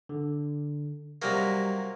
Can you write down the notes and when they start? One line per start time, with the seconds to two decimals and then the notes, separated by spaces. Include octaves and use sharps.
0.09 D3
1.22 C3 F#3 G3 A#3 A#6